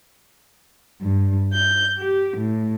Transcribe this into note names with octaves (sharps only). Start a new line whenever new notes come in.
G2
G6
G4
A2